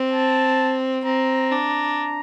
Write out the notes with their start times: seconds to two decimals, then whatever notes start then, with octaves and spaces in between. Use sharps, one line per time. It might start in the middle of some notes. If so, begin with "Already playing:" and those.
Already playing: C4
0.12 A5
1.05 C4 A#5
1.51 D4